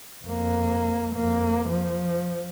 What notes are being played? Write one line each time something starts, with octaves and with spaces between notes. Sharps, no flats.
F2 A#3
F2 A#3
F3